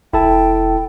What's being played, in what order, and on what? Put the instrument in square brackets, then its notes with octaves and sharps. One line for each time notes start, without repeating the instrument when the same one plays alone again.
[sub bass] E1 [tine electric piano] E4 A4 A5 [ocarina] G5